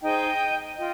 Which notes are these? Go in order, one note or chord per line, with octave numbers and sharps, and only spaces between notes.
D#4 G#4 C5 D#5 G5
F4 D#5 G5